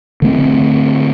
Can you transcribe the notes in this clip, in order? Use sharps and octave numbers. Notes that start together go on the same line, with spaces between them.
D3 A3 C4